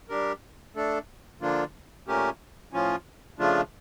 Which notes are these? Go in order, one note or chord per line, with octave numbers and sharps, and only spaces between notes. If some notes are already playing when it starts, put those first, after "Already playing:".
G3 D4 G4 A#4
A3 D4 A4
D3 F3 A#3 D4 F4
A#2 A3 C#4 G4 A#4
A2 F3 C#4 F4
C#3 F3 A3 D4 F4